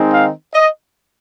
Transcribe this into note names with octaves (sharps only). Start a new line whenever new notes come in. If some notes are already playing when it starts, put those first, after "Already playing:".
Already playing: D#3 G#3 C4 D#4
F5
D#5